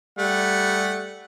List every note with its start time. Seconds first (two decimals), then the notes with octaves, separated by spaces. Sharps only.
0.18 G3 A3 F#5